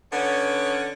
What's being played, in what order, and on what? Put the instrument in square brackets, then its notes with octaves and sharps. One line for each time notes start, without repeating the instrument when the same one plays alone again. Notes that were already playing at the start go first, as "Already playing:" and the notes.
[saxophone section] D3 B3 C#4